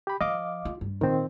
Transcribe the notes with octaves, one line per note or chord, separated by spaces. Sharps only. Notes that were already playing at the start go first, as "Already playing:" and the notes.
G4 B5
F3 D#5 F5 D6
F4
G2
A#2 D#3 A#3 C4